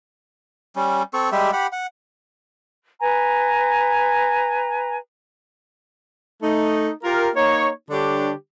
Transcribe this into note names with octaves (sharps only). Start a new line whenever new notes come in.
G3 C#4
C4 A4 C#6
G3 G#3 G4 E5
G4 F#5 B5
F#5
B4 G#5 A#5
A3 D#4
F4 G4 A#4
A#3 D#4 C#5
D3 G3 D4 G4 C#5